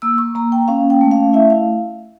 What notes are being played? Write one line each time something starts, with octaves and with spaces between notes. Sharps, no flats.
A#3 E6
C#6
A#3 A#5
G5
C#4 F5
G5
A3
F5
E4 E5
F5